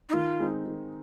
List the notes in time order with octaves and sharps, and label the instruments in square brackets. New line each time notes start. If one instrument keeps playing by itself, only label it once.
[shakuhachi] D#4
[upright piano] D#3 [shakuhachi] F4
[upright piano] G#3 C4 D#4
D#3